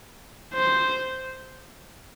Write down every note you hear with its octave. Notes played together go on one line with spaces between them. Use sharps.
C5